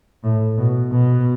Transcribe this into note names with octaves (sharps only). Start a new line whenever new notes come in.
A2
B2
B2